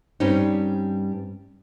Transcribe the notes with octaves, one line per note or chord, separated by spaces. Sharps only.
G2 G3 C4 C#4 D#4